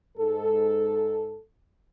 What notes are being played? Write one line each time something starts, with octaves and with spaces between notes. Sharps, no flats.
G#2 A4